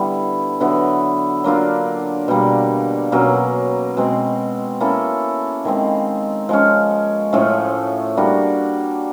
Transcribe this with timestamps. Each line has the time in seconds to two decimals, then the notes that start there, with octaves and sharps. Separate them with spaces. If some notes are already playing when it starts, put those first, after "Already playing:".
Already playing: D3 G3 B3 E4
0.60 D3 F#3 B3 E4
1.44 F#3 A#3 D4 F4
2.28 B2 G3 A#3
3.12 B2 F#3 A#3 C#4
3.97 B2 G#3 C4
4.80 A#3 C#4 E4 A4
5.65 D#3 G#3 C4
6.49 F3 G#3 C#4
7.33 A2 F3 A3 C#4
8.17 G3 A#3 D4 F#4